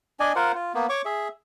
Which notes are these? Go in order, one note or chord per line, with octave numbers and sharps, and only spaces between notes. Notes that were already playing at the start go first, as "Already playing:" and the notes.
D4 D5 D#5 G#5
F4 A#4 C5 F#5
F4
A#3 B3
C#5 C#6 D6
G#4 E5